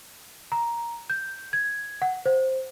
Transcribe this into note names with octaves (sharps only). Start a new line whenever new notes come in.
A#5
G6
G#6
F#5
C5